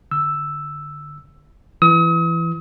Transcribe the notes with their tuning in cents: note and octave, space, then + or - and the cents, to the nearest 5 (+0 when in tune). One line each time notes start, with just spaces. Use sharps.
D3 +0 E6 +0
E3 +20 D#6 +40